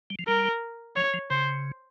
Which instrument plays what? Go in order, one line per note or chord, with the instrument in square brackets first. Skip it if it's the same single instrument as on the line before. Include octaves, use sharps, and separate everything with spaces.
[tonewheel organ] G3
F3
[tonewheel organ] G3 [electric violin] A#4
[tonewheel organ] F3 [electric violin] C#5
[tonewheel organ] F3
[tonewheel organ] C#3 [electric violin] C5